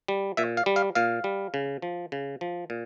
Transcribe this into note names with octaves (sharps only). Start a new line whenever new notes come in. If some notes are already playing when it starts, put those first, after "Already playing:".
G3
A#2 E5
F5
G3
F5
A#2 F5
G3
C#3
F3
C#3
F3
A#2